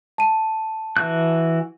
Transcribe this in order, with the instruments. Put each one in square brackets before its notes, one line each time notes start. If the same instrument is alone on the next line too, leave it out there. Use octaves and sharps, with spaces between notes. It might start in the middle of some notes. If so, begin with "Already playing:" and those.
[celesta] A5 D#7
[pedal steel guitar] E3 F#4 F#6